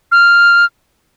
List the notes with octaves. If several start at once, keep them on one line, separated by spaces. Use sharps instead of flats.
F6